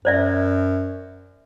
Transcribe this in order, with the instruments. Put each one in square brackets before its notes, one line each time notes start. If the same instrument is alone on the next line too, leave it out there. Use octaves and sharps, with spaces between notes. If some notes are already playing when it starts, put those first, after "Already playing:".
[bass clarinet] F#2 [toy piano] C5 D5 E5